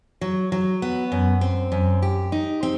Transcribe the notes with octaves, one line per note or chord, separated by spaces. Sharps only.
F#3
F#3
B3
F#2
C4
F#2
G4
D#4
C4